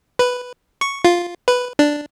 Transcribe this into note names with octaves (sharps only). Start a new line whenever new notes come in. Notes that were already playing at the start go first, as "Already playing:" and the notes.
B4
C#6
F4
B4
D4